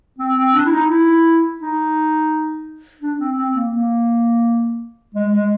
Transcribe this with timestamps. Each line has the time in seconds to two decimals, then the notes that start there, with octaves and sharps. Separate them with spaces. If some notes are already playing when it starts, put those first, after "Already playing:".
0.18 C4
0.37 C4
0.54 D4
0.66 E4
0.72 D#4
0.89 E4
1.60 D#4
3.02 D4
3.20 C4
3.37 C4
3.55 A#3
3.73 A#3
5.15 G#3
5.32 G#3